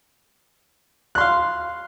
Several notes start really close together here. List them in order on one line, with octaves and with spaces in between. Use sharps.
F#6 C6 F5